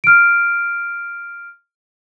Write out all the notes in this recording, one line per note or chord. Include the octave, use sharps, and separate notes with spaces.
F6 D7